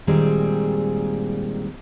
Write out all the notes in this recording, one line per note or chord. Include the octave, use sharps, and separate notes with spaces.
A#2 D#3 G3 G#3 C4 G#4